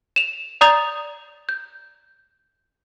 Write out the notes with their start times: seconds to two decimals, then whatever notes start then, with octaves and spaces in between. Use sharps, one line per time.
0.16 E7 F7
0.61 D5 A#5 D#6 G6 A6 F7
1.49 G6